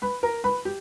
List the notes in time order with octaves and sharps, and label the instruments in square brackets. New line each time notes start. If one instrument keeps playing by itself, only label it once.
[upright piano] B4 B5
A#4 A#5
B4 B5
G4